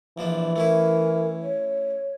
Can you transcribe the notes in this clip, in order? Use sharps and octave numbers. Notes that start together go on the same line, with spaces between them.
A#1 E3 F3 D4
A3 C#4 E4 A#4
C#5